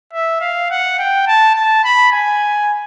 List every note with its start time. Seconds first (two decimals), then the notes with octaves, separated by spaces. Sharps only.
0.13 E5
0.41 F5
0.70 F#5
0.99 G5
1.27 A5
1.55 A5
1.84 B5
2.12 G#5